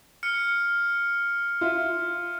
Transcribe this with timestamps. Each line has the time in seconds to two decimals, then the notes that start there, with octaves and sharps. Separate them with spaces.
0.23 F6 C#7
1.61 F4 E5